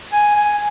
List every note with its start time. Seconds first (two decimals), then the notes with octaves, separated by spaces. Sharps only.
0.12 G#5
0.35 G#5